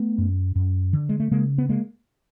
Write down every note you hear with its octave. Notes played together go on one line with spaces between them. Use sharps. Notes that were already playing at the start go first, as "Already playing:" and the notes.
Already playing: A3 B3
F#2
F#2
D3
G#3
A3
C#3 G#3 A#3
B3
G#3 A#3